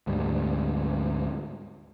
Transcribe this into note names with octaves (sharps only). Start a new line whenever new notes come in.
D2 G#2 G3